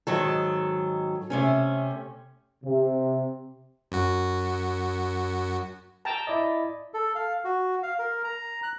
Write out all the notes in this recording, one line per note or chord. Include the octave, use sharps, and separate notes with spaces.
G#2 D#3 F#3 A4
C3 A3 C#4
C3
F#2 F#4
G5 A5 A#5
E4 D5 D#5
A4
F5
F#4
F5
A#4
A#5
F#6